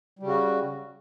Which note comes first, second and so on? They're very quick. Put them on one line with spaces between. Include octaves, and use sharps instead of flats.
G3 C#3 F#4